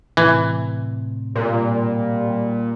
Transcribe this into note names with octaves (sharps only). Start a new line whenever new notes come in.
A2 C3 E3
A#2 G3